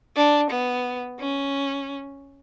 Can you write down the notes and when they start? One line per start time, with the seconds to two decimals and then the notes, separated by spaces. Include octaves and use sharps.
0.16 D4
0.50 B3
1.20 C#4